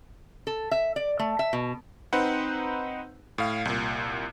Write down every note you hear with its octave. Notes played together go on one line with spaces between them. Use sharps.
A4
E5
D5
A3
E5
B2
C4 D#4 B4 C5 F#5
A2 F5
C2 A#2